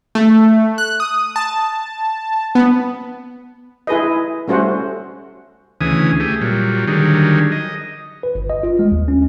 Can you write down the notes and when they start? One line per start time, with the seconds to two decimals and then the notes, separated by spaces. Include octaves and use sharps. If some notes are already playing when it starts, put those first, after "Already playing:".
0.15 A3
0.78 F#6
1.00 D#6
1.36 A5
2.55 B3
3.87 E4 G#4 B4 D#5
4.48 G3 A3 C#4 F#4 C5 F#5
5.81 D2 C#3 E3 G#5 D#6
6.20 A3 G4 G#4
6.41 A#2 F#3 G3
6.87 D3 D#3 F#3 G3 G#4
7.52 D#5
8.23 B4
8.35 G1
8.50 D#5
8.63 F4
8.79 G#3
8.92 D#2
9.08 C#4